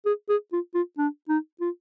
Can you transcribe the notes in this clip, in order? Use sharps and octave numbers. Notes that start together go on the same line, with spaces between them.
G#4
G#4
F4
F4
D4
D#4
F4